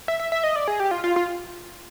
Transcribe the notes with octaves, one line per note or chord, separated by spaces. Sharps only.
E5
E5
E5
D#5
D5
G#4
G4
F4
F4
F4